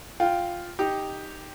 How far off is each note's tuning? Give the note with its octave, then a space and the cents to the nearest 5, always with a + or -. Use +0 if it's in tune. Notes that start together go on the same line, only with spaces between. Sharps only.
F4 +0 G5 +0
D#4 +0 G4 +0